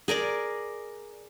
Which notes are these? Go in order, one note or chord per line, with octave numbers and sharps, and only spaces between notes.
G#4 A#4 D5 A#5